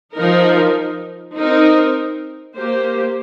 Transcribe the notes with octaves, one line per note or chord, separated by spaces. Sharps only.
F3 D#4 A#4
C4 D#4 A#4
A#3 G4 C5